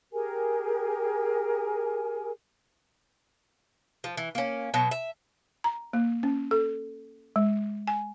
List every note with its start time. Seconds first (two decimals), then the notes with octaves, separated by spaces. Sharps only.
0.12 G4 G#4 A#4 G#5
4.04 F3
4.17 E3
4.35 A#3 C#4
4.74 B2 F#3
4.91 E5
5.64 A#5
5.93 A#3
6.23 C#4
6.51 A4
7.36 G#3
7.87 G#5